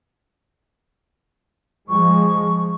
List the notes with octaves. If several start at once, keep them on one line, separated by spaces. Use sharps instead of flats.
F3 G#3 C#6